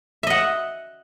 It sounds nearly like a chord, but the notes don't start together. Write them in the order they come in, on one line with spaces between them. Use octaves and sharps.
E5 D#5 F#5